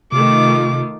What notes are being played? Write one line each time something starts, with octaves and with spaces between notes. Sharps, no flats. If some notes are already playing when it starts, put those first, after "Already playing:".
C3 D#3 A3 F4 D6